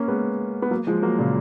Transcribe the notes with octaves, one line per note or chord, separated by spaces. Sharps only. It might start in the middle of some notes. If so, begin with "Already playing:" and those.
Already playing: A#3 C#4
G#3 B3
B3
F#3 A#3
F3 G#3
F#3 A#3
A#2 C#3